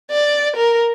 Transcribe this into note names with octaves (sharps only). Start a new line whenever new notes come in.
D5
A#4